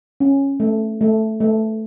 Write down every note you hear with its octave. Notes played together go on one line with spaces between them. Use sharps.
C#4
A3
A3
A3